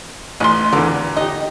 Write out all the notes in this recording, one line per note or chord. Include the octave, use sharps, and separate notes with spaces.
A1 D#5 C6
E2 D3 B3 A#4
D#4 G4 D#5